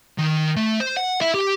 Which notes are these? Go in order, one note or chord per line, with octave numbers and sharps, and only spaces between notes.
D#3
A3
C5
F#5
E4
G4